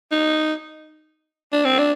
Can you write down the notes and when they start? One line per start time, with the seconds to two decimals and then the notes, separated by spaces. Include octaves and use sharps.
0.11 D#4
1.52 D4
1.65 C4
1.78 D4